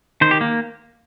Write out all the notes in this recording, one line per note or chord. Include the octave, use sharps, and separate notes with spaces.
D#3 C5
G4
A#3